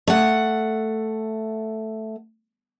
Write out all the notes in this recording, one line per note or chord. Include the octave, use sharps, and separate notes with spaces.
A3 F#5